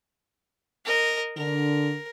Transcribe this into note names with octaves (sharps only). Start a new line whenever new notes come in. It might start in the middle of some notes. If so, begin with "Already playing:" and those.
A#4 D#5
D3 A#4